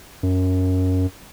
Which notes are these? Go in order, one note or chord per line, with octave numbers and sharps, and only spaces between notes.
F#2